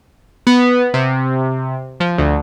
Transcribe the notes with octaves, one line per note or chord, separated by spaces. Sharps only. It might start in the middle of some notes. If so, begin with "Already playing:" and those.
B3
C3
F3
D2